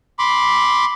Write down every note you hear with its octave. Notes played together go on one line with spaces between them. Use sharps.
B5 C6 D6